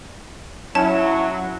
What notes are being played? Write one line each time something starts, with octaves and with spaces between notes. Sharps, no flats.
F#3 C#4 E4 A5